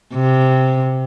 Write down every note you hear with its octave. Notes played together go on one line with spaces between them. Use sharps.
C3